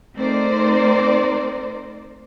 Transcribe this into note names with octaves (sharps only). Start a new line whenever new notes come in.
A3 C4 D#4 A#4 C5 D5